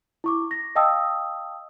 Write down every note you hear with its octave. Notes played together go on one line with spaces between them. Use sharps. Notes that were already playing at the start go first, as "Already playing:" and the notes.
E4 C#6 D6
A#6
D#5 F5 G5 A5 D#6 E6